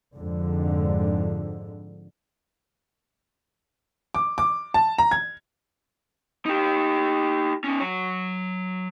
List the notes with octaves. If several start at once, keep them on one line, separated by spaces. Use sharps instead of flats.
F2 G#2 D3
D6
D6
A5
A#5
G#6
D#4 G4
C#4 D#4
F#3 C#5